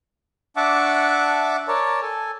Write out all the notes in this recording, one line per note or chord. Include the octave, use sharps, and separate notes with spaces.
D4 E5 F#5 A5 C#6 D6
A#4 C#5 D5 A5
A4 G#5